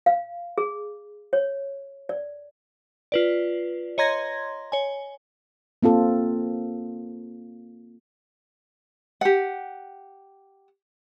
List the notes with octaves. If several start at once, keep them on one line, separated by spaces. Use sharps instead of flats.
F5
G#4
C#5
D5
F4 B4 D5
C#5 D#5 A#5 C6 G#6 A#6
C#5 G#5
A#3 C4 F4 A4
G4 F#5